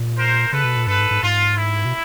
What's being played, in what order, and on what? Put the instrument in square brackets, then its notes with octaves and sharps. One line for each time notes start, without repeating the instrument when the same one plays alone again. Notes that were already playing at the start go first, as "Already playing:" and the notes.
Already playing: [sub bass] A#2
[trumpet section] A#4 C5
[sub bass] C#3 [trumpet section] A4 B4
[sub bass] B2
A#2
[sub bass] G2 [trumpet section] A4 B4
[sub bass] G#2
G#2
[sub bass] G#2 [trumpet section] F4
[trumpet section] E4
[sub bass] B2